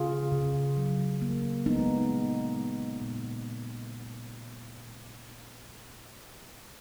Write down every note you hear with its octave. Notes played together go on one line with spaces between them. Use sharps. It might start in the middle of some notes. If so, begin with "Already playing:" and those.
Already playing: C#3 F4 G#4
C#3
F#3
A#3
G#3 B3 D#4
A#2
G#3
A#2